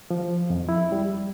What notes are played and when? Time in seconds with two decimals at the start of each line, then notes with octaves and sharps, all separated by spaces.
0.10 F3
0.50 F2
0.69 E4
0.92 G3